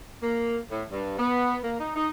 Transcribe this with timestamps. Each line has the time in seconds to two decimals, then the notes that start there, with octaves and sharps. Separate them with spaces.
0.22 A#3
0.70 A2
0.91 G2
1.18 B3
1.62 A#3
1.79 D#4
1.96 D#4